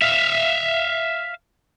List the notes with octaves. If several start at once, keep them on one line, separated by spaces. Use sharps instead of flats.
E5 F5